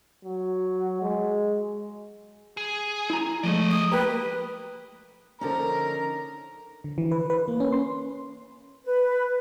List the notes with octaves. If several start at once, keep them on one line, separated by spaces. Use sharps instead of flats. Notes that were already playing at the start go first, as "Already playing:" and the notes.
F#3
G#3
G#4
E4 A#5
F3 G#3 A3 D5 D#5
D#6
A#3 G4 A#4 B4
D3 F3 C#4 D#4 A#4 A#5
D3
E3
B4
B4
A#3
C#4
C6
B4